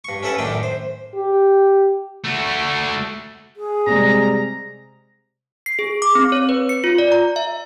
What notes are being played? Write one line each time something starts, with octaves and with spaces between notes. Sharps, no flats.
G2 C#6
C#4 E4 A4 B4 F#5
F#2 A2 D#3 D4 G5
C5
G4
A3 F#4
G#4
C3 G3 G#3 A#5
C7
G#4
D6
C4
C#5
B4
C#7
F4
D5
A#5
E5